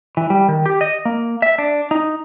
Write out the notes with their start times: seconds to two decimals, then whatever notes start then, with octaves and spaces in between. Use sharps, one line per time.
0.17 E3
0.30 G3
0.48 D#3
0.66 G4
0.81 D#5
1.05 A#3
1.42 E5
1.58 D4
1.91 D#4